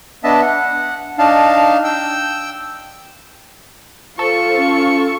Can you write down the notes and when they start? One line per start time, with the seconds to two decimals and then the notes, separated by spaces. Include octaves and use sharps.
0.24 B3 D4 D#5 E5 A5
0.42 F#5
1.18 D4 D#4 F5 A5
1.84 G5 E6
4.19 F4 A4 C5 C#6
4.57 C#4